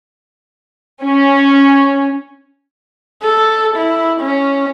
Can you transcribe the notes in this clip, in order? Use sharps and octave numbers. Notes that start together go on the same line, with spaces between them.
C#4
A4
E4
C#4